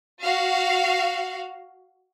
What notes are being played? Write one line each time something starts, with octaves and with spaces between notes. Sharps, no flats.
F#4 F5